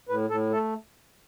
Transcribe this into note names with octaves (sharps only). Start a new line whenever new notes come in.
A2 B4
A2 A4
A3 A4